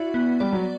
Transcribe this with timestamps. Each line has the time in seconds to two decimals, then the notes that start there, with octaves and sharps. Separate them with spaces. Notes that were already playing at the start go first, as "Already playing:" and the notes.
Already playing: E4 F#4 D5
0.14 B3
0.40 G3 D5
0.53 F#3